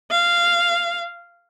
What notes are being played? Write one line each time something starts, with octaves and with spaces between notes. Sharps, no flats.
F5